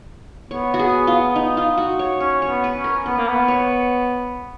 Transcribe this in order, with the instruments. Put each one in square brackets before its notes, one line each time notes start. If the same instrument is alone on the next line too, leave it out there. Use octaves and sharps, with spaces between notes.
[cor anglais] B3 [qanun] C#5
[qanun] F#4
G#4
F4
D#4
F4
F#4
C#5
[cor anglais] C#4 [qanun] C#5
[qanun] C#5
[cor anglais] B3
[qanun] B4
[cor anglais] C#4
[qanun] A#4
[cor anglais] B3 [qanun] B4
[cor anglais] A#3
B3
[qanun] C#5